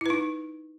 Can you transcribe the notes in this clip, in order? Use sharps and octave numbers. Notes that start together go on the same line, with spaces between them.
D#4 E4 B4